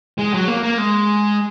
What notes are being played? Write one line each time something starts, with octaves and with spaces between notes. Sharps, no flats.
G#3
F#3
A#3
A#3
G#3